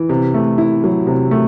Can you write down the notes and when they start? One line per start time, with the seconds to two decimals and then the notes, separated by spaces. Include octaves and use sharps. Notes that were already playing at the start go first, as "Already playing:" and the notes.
Already playing: E3
0.09 C3
0.34 A3
0.58 E4
0.84 F#3
1.07 C3
1.31 A3